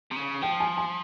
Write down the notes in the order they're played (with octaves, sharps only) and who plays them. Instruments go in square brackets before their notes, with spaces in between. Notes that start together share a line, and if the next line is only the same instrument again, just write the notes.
[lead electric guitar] C3
C#3
[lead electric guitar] F3 [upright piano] G5
[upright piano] G#5
G#5